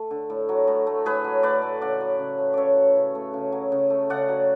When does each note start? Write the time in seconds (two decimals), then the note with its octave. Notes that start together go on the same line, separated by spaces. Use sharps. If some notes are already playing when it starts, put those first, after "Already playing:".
Already playing: A3
0.11 D3
0.30 A2
0.49 F#3
0.67 A2
0.87 A3
1.05 A2 G#4 B4
1.24 F#3
1.43 A2 B4 D5
1.62 A3
1.81 C#3 D5 F#5
2.01 F#3
2.19 C#3
2.38 A3
2.54 C#3 C#5 D5 E5
2.77 F#3
2.96 C#3
3.15 A3
3.34 C#3
3.52 F#3
3.72 C#3
3.90 A3
4.10 C#3 D5 F#5
4.29 F#3